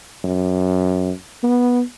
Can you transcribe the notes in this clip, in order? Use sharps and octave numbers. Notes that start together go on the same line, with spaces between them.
F#2
B3